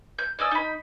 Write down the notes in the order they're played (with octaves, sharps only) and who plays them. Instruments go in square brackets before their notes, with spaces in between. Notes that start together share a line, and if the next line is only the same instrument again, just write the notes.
[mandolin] G6
D5 D#5 G#5 E6
D#4 B5